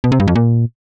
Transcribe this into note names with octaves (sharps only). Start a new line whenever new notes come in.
B2
C3
G2
F2
A#2